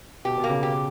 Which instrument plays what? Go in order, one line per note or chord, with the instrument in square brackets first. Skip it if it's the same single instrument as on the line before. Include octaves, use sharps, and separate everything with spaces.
[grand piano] B2 [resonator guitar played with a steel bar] G4
[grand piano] B2
[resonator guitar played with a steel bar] A#3
[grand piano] C#3
[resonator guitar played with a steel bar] G4